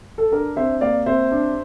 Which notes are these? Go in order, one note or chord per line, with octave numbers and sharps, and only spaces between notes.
A4
D4 A#4
C3 C5 E5
A#3 D5 F5
C3 C5 E5
D4